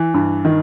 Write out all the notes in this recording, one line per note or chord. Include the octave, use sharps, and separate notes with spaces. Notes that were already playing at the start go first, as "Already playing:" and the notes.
Already playing: E3
G2
D#3